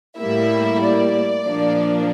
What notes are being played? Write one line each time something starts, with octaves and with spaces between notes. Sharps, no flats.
A2 G3 A#3 E4 E5
D5
A#2 F3 A#3 D4